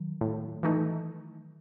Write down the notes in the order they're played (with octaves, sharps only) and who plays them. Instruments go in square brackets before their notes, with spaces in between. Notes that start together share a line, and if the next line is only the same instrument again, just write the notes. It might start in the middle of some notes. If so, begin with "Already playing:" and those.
Already playing: [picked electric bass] D#3 F#3
[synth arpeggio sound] A2
E3 A3 D#4